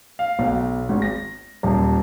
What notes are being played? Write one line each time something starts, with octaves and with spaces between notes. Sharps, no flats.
F5
B1
G#1
A#6
D#1